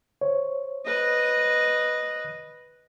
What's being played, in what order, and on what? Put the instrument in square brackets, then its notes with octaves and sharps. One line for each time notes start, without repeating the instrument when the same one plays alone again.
[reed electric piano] C5 C#5
[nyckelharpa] B4 D#5